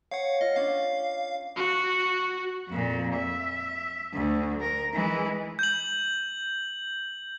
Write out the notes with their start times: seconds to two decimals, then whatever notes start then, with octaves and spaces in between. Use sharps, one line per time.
0.11 C#5 F5 F#5
0.41 F4 D#5
0.56 C#4 D4 F5
1.56 F#4
2.68 F2 A#2
3.16 E5
4.13 D2
4.61 A#4
4.94 E3 G#3
5.59 G6 F#7